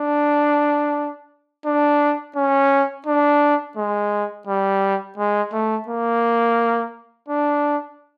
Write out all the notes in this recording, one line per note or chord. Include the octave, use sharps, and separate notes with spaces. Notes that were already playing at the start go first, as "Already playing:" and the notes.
Already playing: D4
D4
C#4
D4
G#3
G3
G#3
A3
A#3
D4